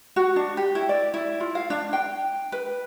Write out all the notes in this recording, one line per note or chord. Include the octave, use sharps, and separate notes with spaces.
F#4
D4
G4
E4
D5
E4
F4
F5
D4
G5
B4